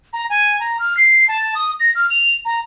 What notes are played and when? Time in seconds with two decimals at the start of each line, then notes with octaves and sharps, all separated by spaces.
0.13 A#5
0.30 G#5
0.60 A#5
0.79 F6
0.97 C7
1.28 A5
1.55 D#6
1.80 A#6
1.95 F6
2.10 F7
2.45 A#5